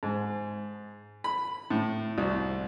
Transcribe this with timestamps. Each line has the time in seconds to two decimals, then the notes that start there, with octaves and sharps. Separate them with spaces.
0.03 G#2
1.24 B5
1.70 A2
2.18 C2